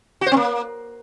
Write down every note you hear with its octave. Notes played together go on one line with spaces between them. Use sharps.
F#4
C5
C4
A#3